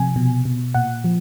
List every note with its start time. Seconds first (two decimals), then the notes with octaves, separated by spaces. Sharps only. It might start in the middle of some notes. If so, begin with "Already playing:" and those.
Already playing: C3 F3 G#5
0.16 B2
0.45 B2
0.74 A#2 F#5
1.04 F3